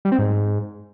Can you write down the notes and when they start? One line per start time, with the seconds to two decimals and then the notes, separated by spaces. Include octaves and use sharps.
0.05 G3
0.12 C4
0.19 G#2